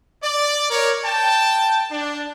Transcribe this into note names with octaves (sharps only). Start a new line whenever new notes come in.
D5
A#4 C#5
G5 A5
D4